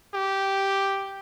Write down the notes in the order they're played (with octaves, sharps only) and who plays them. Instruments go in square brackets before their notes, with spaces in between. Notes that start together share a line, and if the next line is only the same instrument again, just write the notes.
[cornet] G4